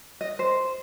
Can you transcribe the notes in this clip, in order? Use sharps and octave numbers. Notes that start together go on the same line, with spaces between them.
D#5
C5